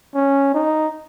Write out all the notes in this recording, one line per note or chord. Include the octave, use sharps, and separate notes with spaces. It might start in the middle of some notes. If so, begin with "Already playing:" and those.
C#4
D#4